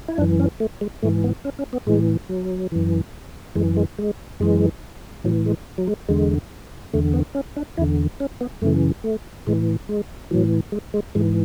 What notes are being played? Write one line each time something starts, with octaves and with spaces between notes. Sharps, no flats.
E4
F#2 E3 D4
C#4
A3
G#3
G#2 E3 A3
B3
C#4
C#4
B3
A2 E3 G#3
F#3
F#2 E3
F#2 E3 G#3
G#3
G#3
F#2 E3 G#3
A2 E3 F#3
G#3
F#3
G#3
E2 D3 G#3
E2 D3 A3
B3
C#4
D4
E2 D3 E4
C#4
B3
F#2 C#3 E3 A3
A3
A2 E3 G#3
G#3
A2 E3 F#3
G#3
G#3
G#2 E3 G#3